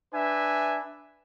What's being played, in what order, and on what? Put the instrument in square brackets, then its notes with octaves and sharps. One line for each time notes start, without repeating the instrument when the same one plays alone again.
[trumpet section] D4 B4 E5 G#5